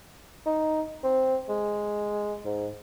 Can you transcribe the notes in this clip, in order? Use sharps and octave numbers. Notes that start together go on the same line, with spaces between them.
D#4
C4
G#3
G#2